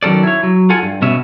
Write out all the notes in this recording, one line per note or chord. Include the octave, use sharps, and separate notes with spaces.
D#3 F#3 C#4 A4 D5
E4 C#5
F#3
F4 A4 F#5 G#5
G2
B2 B3 C#4 E5